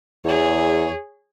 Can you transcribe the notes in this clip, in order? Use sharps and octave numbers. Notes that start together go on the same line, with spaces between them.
E2 G#4 C#5